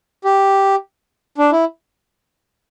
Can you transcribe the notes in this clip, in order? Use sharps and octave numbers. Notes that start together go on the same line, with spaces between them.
G4
D4
E4